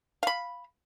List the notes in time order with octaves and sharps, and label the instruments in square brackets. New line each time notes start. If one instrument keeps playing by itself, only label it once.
[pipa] F5 B5